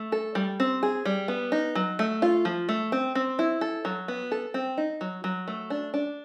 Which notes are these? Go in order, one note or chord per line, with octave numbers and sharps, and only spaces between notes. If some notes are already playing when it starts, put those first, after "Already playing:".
Already playing: A3
A4
G3
C4
G#4
G3
B3
D#4
F#3
A3
F4
F3
A3
C4
C4
E4
A4
F#3
B3
A4
C4
D#4
F#3
F#3
A3
D4
D4